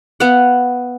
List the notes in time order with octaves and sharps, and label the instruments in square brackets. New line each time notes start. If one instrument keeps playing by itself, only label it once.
[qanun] B3 F5 F#5